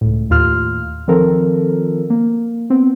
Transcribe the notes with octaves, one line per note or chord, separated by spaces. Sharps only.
C#2 A2
D#2 A2 F4 F6
D#3 F3 C4 F4 A4 A#4
A#3
B3 C4